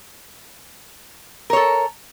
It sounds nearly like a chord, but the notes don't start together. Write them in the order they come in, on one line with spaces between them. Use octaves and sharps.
A#4 C#5 A4